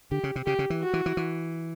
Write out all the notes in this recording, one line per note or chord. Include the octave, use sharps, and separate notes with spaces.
D3 G4
C#3
C3
C#3 G4
C#3
E3
F#4
E3
E3
E3